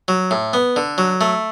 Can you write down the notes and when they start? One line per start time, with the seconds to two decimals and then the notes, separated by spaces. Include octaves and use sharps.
0.08 F#3
0.31 A2
0.53 B3
0.76 D3
0.98 F#3
1.21 A3